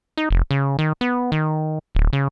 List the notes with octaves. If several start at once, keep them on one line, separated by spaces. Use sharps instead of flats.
D#4
F1
C#3
D#3
B3
D#3
D1
C#3